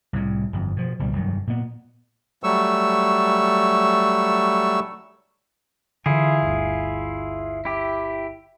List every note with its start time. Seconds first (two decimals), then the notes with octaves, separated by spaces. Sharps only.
0.13 C2 A2
0.53 G1 F2
0.77 B2 F3
0.99 D1 C#2 B2 G3
1.15 F1 G2 D#3 F#3
1.47 A#2 B3
2.44 F#3 G3 A3 C#6 E6
6.06 D3 E3 E4 F4 G#4
6.42 G1 D2
7.65 E4 G4